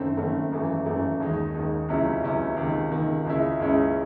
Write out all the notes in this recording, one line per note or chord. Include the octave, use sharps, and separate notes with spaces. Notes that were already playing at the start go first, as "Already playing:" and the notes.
Already playing: F#1 F#2 D#3 A3 C4
F#1 F#2 D#3 A3 C4
G#1 F#2 E3 A3
G#1 F#2 E3 A3
D#2 D#3 G#3 D#4
D#2 D#3 G#3 D#4
C#2 C3 F#3 C#4 E4
C#2 C3 F#3 C#4 E4
C#2 C3 D#3
C#2 C3 D#3
C#2 C#3 G#3 C#4 E4
C#2 C#3 G#3 C#4 E4